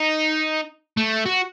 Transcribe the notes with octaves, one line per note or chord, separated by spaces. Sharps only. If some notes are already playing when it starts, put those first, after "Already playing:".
Already playing: D#4
A3
F#4